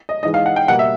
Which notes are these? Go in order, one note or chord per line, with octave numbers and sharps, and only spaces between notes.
D#5
G#2 E3 G#3 D#5
F5
F#5
G5
B2 G3 A#3 F#5
E5